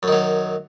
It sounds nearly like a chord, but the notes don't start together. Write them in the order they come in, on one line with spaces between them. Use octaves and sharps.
F#2 D#3 F#3